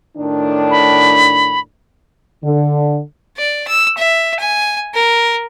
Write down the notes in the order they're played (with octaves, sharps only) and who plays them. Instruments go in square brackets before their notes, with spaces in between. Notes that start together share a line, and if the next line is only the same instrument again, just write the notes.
[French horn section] A2 D#3 D4
[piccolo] B5
[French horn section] D3
[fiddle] D5
E6
E5
G#5
A#4